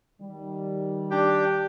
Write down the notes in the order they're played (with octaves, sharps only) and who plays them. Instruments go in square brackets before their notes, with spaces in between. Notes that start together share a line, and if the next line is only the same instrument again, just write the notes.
[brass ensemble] D#3 G3
[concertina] D4 G5 [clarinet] G4